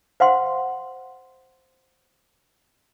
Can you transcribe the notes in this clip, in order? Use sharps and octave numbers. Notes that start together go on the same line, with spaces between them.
C5 F5 F#5 C6